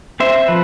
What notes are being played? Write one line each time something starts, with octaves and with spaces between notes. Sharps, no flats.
C4 C5 E5
F3 B4